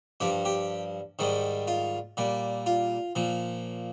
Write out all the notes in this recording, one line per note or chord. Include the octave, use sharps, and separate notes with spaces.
G2 F3 G4
G4
G#2 D#3 G3
F4
A#2 G3
F4
A#2 F3